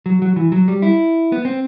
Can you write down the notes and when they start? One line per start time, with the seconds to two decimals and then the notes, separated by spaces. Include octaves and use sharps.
0.06 F#3
0.22 F#3
0.36 E3
0.52 F#3
0.68 G3
0.82 E4
1.32 B3
1.45 C4